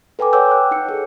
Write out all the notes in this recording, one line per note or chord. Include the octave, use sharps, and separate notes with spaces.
A4 B4 G5 G#5 D6
C#5 F#5 G5 D6 E6 G6
F#6
D#4 C#7
G#4 A4 C#5